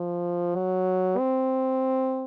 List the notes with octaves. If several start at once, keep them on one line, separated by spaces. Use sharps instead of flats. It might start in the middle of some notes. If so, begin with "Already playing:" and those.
Already playing: F3
F#3
C4